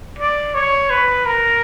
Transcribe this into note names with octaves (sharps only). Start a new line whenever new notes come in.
D5
C#5
B4
A#4